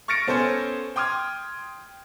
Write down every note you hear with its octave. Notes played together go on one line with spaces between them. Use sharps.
C#6 F6 A6 A#6 C#7 D7
B3 C#4 A4 C5 C#5 G#5
G5 C6 D#6 F6 G#6